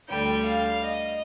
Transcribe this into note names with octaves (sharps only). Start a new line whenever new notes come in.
D2 D3 G3 G5
F5
D#5